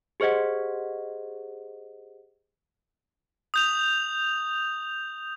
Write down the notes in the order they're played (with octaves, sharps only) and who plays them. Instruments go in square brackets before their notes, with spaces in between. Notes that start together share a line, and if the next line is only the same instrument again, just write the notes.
[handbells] G4 G#4 C5 D#5 F#5
[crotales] D#6 G6 F7